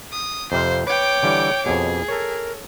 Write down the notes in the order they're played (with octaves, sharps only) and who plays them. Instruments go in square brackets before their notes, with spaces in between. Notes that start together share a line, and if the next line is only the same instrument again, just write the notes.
[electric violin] D#6
[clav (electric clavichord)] F2 C3 F5 [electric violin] C5
[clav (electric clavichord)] B4 [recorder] C#5 [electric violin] G5 D6
[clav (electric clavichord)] D3 E3 G3
[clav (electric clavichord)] F2 B2 [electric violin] G#4
[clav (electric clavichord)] A4 C#5 [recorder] A#4